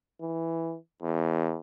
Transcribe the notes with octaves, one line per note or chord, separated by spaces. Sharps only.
E3
E2